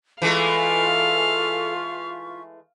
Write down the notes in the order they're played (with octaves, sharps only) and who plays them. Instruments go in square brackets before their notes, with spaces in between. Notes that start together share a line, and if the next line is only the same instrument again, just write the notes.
[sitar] E3 G#3 A3 [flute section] F4 E5 C#6 [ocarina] A4 [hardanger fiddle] F5